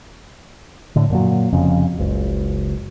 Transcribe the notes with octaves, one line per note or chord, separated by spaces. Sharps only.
A2 D3
F#2 A#2 F#3
F1 F2 C#3
F#1 C#2